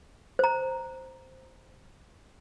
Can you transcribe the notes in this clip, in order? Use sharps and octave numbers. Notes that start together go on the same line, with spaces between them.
C5 A#5